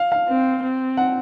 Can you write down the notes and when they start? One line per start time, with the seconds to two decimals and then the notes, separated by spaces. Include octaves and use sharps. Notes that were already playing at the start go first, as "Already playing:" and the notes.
Already playing: F5
0.12 F5
0.28 C4
0.63 C4
0.97 F#5